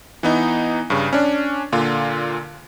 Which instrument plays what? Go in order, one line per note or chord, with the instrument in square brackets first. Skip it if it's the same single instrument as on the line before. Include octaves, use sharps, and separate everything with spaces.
[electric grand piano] E3 B3 D#4
G2 C#3
C#4 D4
A#2 D3 F4